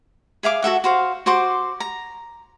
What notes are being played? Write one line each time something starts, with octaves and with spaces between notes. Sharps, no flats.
G#4 E5 F5 D6
F#4 A4 E5 F#5
F#4 C5 F5
F#4 C5 C6 D6
A#5